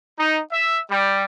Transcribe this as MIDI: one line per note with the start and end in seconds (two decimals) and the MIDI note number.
0.18 0.40 63
0.51 0.80 76
0.91 1.24 55